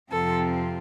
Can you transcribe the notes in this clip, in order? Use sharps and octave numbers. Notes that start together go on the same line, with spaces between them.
F2 C3 F3 C4 F4 A4